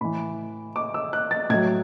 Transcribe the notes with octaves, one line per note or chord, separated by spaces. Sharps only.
A2 E3 B5
D6
E6
F#6
A6
A2 F#3 G#6